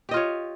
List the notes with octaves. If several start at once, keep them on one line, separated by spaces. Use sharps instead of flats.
F4 G4 C#5 D#5